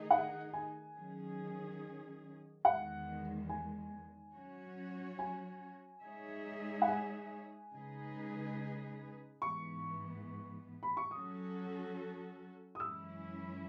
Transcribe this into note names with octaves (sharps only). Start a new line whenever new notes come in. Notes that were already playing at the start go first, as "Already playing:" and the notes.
Already playing: D#3 A3 D#4 G#4
F#5
G#5
D#3 F#3 C#4 G#4
E2 D#3 G#3 F#5
G#5
F#3 C#4 F#4 C#5
G#5
G#3 D#4 G#4 C#5 E5
F#5
G#5
C#3 G#3 D#4 G#4 B4
G#2 E3 B3 C#6
B5
C#6
F#3 C#4 F#4 A4 D#6
D#6
F#2 E3 G#3 C#4 E4 E6